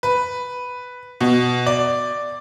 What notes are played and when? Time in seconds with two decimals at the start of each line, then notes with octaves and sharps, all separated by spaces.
0.03 B4
1.21 B2
1.66 D5